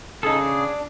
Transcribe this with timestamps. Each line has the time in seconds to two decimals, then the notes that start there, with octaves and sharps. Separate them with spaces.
0.23 C#3 D#4 G#4 A4
0.41 D4